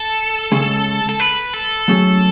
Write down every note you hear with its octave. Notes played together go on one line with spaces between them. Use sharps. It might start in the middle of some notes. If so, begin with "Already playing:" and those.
Already playing: A4
C#3 G#3 C#4 G#4
A4
B4
A4
F#3 A3 C#4 G#4